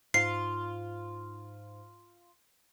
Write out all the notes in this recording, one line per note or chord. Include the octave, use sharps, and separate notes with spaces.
G#2 F4 C7